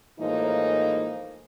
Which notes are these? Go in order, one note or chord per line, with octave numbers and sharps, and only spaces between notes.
A2 E3 F3 G#3 A#3 D#4